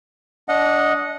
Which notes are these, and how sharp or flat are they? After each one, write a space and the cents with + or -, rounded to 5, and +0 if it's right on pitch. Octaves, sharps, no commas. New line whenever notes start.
D4 -25 D#5 +0 F#5 -15